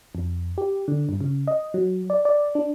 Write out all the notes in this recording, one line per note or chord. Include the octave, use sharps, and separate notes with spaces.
F2
G4
D3
G2
C#3
D#5
F#3
D5
D5
D4